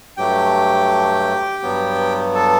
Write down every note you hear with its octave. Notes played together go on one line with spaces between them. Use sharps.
G2 F#3 A3 G4 G5
G2 F#3 B3
A4 A5